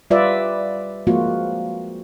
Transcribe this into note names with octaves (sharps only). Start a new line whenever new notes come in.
G3 F4 B4 D5 E5
F3 G#3 A#3 C4 F4 F#4